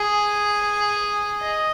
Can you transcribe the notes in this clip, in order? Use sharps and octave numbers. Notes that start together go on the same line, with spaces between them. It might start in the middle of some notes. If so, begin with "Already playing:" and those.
Already playing: G#4
D#5